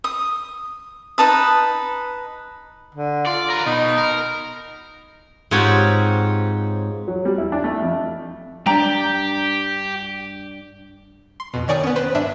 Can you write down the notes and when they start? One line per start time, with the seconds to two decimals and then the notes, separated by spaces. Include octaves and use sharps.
0.04 D#6
1.18 D#4 B4 A5 D#6
2.95 D3
3.26 F4 D5
3.50 A#4 B4
3.66 B2 D#4
3.98 A#4
5.51 G#2 C4 F4 G4 C#5 F#5
7.08 F#3
7.25 G3
7.38 E4
7.52 D4
7.64 A3
7.82 F2
8.66 G2 D4 G4 G5 A#5 D7
11.40 C6
11.54 F2 B2
11.68 D#3 C#5 D5 G#5 D#6
11.83 B3 C#4
11.96 B4 C5
12.15 G2 D4 E5